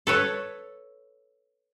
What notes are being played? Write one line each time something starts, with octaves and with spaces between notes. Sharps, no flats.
A4 B4 C#5